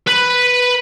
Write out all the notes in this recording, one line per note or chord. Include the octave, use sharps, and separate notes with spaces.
B4 B5